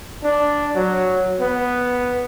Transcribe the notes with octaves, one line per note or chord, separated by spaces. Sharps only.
D4
F#3
B3